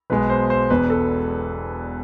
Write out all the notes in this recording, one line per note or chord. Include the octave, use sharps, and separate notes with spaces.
B1 B2 G#3 B4
C5
C5
E1 E2 B2 B4
A4